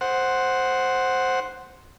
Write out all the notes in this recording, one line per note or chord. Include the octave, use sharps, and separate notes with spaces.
C5 F#5